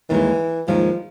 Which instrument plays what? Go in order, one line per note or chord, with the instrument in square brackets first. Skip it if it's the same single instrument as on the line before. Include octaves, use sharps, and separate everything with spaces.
[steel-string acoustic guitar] D#2 D#3 G#3 [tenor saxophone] E3
[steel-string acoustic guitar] D#2 D#3 G#3 [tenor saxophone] F3